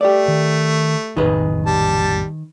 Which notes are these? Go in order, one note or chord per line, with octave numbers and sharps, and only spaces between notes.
A3 G4 D5
D#3
A#1 F2 A2 D#3 G#4 B4
G3 A5